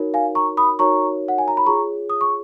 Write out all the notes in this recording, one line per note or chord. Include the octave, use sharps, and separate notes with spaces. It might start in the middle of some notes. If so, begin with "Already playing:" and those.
Already playing: D#4 F#4 A#4 C#5
F5 G#5
A#5 C#6
B5 D#6
D#4 F#4 A#4 C#5 A#5 C#6
F#5
G#5
A#5
B5
F4 G#4 C#5 A#5 C#6
D#6
C#6